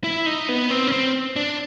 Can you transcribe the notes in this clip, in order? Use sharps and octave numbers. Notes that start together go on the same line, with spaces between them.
E4
D#4
B3
C4
C#4
C4
D4